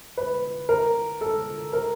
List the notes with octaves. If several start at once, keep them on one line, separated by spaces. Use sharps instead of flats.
B4
A#4
A4
A#4